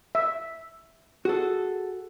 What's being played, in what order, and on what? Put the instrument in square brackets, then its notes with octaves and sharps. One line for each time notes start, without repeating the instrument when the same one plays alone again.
[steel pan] E5
[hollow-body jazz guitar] F#4 G#4 A4